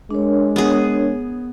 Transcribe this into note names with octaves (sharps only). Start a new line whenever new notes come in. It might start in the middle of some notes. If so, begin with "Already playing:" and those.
G#3 D4 A#4 C#5
B3 G#4